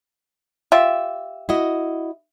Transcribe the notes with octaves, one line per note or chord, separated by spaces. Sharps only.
F4 G4 E5
E4 F#4 D#5